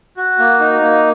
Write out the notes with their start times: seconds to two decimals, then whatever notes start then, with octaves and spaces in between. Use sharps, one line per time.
0.17 F#4
0.39 A#3
0.60 D#4
0.81 A#3